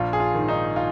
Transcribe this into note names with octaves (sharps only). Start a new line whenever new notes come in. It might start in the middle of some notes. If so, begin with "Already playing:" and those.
Already playing: A#1 F4
G#4
F4
G#2 D#3
D#4
F4